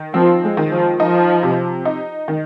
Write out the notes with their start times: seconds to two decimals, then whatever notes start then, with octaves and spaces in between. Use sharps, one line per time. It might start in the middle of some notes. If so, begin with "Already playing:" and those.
Already playing: D#3
0.14 F3 C4
0.43 G#3
0.57 D#3
0.71 F3
1.00 F3 D#4
1.43 C3
1.85 D#4
2.28 D#3